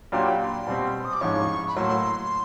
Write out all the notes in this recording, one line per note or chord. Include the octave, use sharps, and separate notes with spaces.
A#2 F#3 A#3 D4 G4 C6
B5
C6
B2 G3 C4
D#6
D6
G#2 F3 G#3 C#4 E4 C#6
B5
A2 F#3 A#3 C6